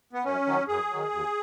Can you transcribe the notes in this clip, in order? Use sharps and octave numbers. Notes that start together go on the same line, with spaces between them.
B3
F#2 C#4
D#3 F#3
F#2 G#4
D#3 F#3
D#2